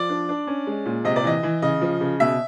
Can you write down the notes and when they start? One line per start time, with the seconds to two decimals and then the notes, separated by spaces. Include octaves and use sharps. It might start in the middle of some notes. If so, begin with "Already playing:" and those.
Already playing: F3 D5
0.09 D4
0.29 D4
0.47 C#4
0.67 G#3
0.86 A#2
1.05 C3 D#5
1.16 D5
1.24 E3 D#5
1.43 E3
1.62 C#3 D#5
1.82 F3
2.01 C#3
2.20 B2 E5